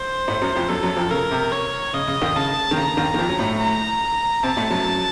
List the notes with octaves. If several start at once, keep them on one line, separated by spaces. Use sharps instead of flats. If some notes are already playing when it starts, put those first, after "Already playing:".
Already playing: C5
A2 A3
F#2 F#3
F2 F3
F#2 F#3 A4
F#2 F#3
F2 F3
C#3 A#4
C3
C#5
C#3 D#5
C#3
D#2 D#3
C#3 A5
D#3
C#3 A#5
D#2 D#3
D#3
F2 F3
F#3
A2 A3
A#5
C3 C4 A5
A2 A3
F#2 F#3